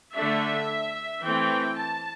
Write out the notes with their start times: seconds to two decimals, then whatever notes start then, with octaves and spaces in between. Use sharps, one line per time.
0.14 D3 A3 D4 E5
1.23 E3 A3 C4 G5
1.77 A5